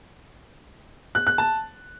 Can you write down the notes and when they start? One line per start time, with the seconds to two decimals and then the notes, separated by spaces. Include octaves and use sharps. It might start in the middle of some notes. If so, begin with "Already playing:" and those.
1.15 F#6
1.27 F#6
1.38 A5